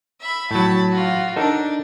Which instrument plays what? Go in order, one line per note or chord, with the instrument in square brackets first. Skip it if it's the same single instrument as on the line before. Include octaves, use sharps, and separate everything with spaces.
[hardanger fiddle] E5 B5
[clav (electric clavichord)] A2 F#3 [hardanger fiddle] A5 B5
[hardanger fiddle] F4 F#4
[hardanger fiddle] D4 [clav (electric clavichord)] D#4 A4 A#4